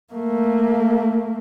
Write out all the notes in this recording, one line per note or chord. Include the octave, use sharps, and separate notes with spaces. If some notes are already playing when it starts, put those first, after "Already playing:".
A3 A#3